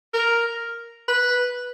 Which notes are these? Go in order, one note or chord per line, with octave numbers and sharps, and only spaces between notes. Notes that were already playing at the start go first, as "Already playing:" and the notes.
A#4
B4